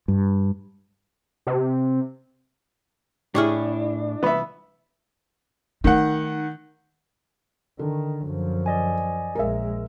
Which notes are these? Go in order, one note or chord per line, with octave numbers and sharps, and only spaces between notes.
G2
C3
A2 D4 E4 G4 G#4 C#5 C#6 F6
C2 E3 B3 E5 B5
D#3 A3 D#4 F#5
D3 D#3
F#2 F3
D5 D#5 G#5
A#1 G#3 A#4 E5